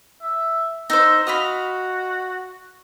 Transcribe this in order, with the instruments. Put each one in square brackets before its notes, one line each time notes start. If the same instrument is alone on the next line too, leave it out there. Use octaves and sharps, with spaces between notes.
[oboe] E5
[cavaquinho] D#4 C5 [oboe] E6
[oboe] F#4 [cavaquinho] D#5 F5 B5